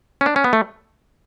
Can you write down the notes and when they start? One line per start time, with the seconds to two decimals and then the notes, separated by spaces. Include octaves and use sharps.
0.21 C#4
0.26 D4
0.36 C#4
0.44 B3
0.53 A3